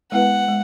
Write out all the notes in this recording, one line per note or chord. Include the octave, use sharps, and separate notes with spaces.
G#3 B3 E4 B4 F#5
G#3